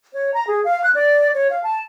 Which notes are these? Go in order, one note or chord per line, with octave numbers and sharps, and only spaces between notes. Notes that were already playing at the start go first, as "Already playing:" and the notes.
C#5
A#5
G#4
F5
F#6
D5
C#5
F5
A5